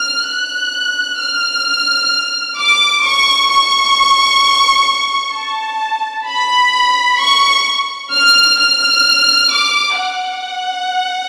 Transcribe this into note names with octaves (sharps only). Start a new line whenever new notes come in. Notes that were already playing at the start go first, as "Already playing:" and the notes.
Already playing: F6
F#6
F6
D6
C#6
C#6
A5
B5
C#6
F6
F6
D6
F#5